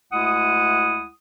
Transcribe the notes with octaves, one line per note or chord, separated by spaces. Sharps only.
D2 G#3 E4 F#5 D#6